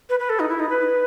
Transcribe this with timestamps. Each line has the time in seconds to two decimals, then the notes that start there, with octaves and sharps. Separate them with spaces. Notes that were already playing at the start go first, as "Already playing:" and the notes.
0.09 B4
0.20 B4
0.29 A4
0.40 D#4
0.49 E4
0.59 D#4
0.70 B4